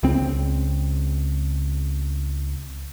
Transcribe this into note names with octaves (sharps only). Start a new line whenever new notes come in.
C#2 C4